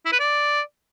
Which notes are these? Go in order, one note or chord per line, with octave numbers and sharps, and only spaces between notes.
E4
B4
D5